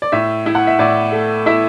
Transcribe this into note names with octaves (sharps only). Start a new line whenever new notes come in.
D5
A2 E5
E4
F#5
E5
A2 D5
A3
E4 E5